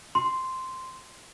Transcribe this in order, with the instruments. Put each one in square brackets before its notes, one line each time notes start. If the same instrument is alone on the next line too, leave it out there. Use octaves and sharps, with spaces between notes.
[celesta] C6